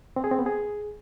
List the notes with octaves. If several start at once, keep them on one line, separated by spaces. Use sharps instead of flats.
C4
G#4
C4
B3
G#4